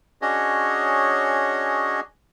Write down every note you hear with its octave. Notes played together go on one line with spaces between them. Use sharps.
C#4 D4 F#4 G#4 C#5 D#5